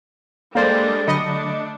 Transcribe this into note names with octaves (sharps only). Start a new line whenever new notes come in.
G3 G#3 A#3 D4 A4 C5 D5 A6
D3 F#3 A3 D4 D#5 B5 C#7